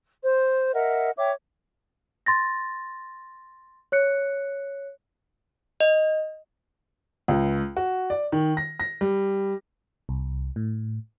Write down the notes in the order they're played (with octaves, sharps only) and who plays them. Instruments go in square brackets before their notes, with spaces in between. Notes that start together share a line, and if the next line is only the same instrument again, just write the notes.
[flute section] C5
A#4 D#5 E5 F#5
C#5 E5 G5 D6
[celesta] C6 A6 A#6
C#5 F#6 C#7
[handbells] D#5
[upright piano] C#2
F#4
D5
D#3
A#6
A#6
G3
[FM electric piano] C2
A2